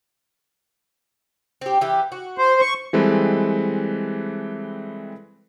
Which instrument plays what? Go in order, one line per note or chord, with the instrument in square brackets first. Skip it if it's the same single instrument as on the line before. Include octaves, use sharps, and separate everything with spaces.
[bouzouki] C4 G4
E3 G4
F#4
[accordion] C5
C#6
[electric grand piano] E3 G3 G#3 C4 A4 B4